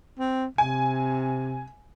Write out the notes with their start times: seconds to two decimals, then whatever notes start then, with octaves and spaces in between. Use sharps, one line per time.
0.19 C4
0.58 C3 G#5